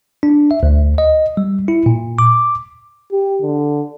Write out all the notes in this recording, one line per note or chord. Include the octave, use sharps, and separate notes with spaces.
D4
E5
D2
D#5
G3
E4
A#2
D6
G4
D3